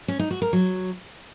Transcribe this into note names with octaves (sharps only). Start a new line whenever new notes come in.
C#4
D#4
F#4
A#4
F#3